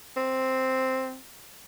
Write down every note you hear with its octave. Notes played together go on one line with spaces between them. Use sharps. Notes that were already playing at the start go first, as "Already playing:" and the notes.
C4